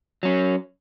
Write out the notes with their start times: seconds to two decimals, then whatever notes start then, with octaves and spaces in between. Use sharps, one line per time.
0.23 F#3 C#4